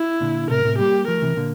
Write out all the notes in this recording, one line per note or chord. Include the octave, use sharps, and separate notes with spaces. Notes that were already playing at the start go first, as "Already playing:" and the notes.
Already playing: E4
A#2 D3
A2 C3 A#4
A2 C3
G3 A#3 G4
F3 A3 A#4
C3 E3
A#2 D3